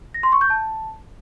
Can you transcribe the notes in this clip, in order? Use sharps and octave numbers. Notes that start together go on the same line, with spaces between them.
A#6
C6
C#6
G6
A5